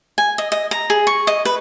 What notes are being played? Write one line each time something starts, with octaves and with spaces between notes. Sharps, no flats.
G#5
D#5
D#5
A#5
G#4
C#6
D#5
B4